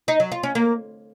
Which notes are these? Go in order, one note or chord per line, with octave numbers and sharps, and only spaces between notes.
D#4
F#3
F4
C#4
A#3